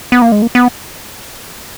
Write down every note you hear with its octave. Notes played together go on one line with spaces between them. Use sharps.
B3
A#3
G#3
A#3
B3